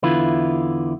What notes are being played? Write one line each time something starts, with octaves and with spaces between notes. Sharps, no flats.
E2 D3 E4 F4 B4